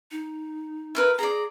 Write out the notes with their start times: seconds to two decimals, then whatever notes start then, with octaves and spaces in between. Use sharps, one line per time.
0.11 D#4
0.95 E4 A#4 B4
1.19 G#4 D5 A#5